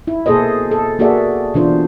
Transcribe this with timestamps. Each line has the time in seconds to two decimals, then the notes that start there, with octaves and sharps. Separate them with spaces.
0.07 E4
0.26 B2 A#3 G#4 A4 C5 D#5
0.71 A4
0.99 A#3 F#4 G#4 A4 D5 E5
1.54 B2 E3 D4 F4 C5